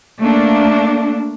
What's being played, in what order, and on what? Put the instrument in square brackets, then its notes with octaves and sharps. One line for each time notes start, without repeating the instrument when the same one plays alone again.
[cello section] A3 A#3 D4